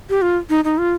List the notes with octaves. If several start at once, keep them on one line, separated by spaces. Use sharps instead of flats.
G4
F4
D#4
D#4
F4